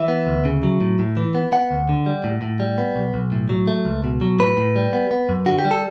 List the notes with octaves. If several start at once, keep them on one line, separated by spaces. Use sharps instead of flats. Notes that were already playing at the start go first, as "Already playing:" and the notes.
Already playing: E3 E5
B3
D2
C#3
F#3
A2
A2
E3
B3
B3 F#5
D2
D3
G3
A2
A2
G3
B3
B1
B1
A2
F#3
A3
C#2
B2
F#3
A2 B4
A2
G3
B3
B3
F#2
D3 F#4
G4
G3
A4